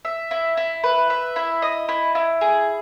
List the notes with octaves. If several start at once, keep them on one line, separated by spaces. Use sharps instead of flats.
E5
E4
E4
B4
E5
E4
D#5
E4
E4
G#4